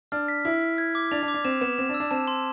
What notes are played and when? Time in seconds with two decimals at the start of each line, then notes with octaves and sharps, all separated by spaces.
0.12 D4 F6
0.28 B6
0.45 E4 B6
0.62 B6
0.78 G#6
0.95 D6
1.11 D4 F7
1.22 D4
1.28 D6
1.34 D4
1.45 C4 E7
1.61 B3 E7
1.78 C4 E7
1.89 D4
1.94 E6
2.00 D4
2.11 C4 A5
2.28 C6